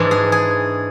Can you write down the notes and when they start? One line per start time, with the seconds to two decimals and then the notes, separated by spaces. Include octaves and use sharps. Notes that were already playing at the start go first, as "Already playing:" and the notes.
Already playing: G#2 E3 G#3 D4
0.11 G#4
0.32 G#4